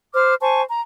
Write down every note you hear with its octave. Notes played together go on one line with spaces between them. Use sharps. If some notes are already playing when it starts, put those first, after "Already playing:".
C5 D6 F6
C5 G#5 A5 C#6
A#5